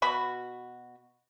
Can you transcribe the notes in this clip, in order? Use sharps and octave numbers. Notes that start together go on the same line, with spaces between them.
B2 F#4 B5